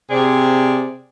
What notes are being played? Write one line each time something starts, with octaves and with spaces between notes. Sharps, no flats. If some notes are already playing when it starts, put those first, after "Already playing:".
C3 G#4 D5